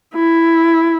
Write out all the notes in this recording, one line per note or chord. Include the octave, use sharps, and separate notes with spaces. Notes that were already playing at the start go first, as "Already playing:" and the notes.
E4